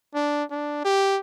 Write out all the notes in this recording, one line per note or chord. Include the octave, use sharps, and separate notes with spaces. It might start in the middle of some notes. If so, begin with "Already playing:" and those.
D4
D4
G4